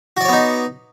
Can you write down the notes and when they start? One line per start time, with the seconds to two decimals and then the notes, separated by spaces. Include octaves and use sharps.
0.17 F#4
0.21 D5
0.25 C#5
0.29 B3
0.32 D#4